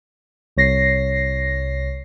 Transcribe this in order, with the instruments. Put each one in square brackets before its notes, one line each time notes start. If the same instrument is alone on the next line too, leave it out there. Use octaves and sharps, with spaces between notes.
[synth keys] C2 C#5 A#6 C7